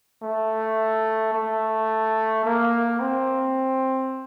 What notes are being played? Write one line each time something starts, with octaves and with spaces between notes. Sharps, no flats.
A3
A3
A#3
C4